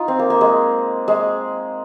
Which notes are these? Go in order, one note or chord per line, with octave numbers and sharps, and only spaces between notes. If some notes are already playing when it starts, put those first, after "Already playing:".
Already playing: D#4 F4
C4
A#3
A#3
G#3
G#3